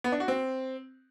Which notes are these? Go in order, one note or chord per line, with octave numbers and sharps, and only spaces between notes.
B3
D4
F#4
C4